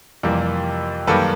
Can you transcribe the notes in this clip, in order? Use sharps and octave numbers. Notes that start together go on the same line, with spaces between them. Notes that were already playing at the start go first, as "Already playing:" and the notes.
F2 C3 E3 G3 A#3
F#2 D#3 G3 A#3 A4 B4